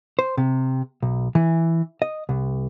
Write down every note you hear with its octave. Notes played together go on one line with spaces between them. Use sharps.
C5
C3
B1
E3
D#5
C2